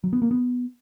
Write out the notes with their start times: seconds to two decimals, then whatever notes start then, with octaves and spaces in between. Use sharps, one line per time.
0.04 F#3
0.13 B3
0.22 A#3
0.31 B3